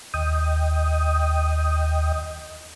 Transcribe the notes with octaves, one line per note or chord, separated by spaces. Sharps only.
D#2 D#5 G5 D#6